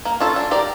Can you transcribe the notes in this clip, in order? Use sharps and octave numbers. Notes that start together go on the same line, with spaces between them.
A#3
C#4 F4 A4
D4
G4 A#4 D5